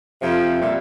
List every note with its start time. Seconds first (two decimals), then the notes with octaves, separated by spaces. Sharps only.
0.22 F2 C3 F3
0.61 A#2 G3 E5